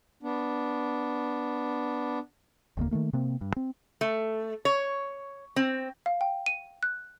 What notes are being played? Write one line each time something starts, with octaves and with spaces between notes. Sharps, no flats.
B3 D4
F1 D#2 D3 A#3
D#3 F#3 A3 A#3
C3 A#3 C4
G2
C4
A3
C#5
C4
F5
G5
D#7
F#6